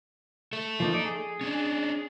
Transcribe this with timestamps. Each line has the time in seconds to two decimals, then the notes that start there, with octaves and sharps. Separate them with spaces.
0.53 A4 E5
0.80 F3 A#3 D#4
0.93 D#4 D5
1.05 G#4
1.41 C#4 D4